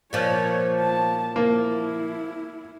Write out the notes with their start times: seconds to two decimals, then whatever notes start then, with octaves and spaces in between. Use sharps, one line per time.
0.13 A#2 F3 C#5
0.80 A5
1.36 A#3 E4